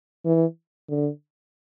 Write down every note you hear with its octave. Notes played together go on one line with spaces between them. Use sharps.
E3
D3